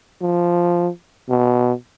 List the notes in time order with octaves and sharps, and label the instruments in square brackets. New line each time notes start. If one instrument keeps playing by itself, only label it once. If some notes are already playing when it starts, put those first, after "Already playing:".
[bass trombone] F3
B2